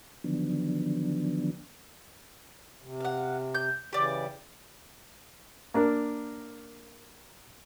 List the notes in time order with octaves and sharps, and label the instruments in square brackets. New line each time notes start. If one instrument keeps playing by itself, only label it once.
[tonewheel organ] D3 D#3 F3 F#3 B3 D4
[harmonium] C3
[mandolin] F5 F#5
G6
[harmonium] C#3 E3 [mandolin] G4 D5
[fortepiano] A#3 D4 A#4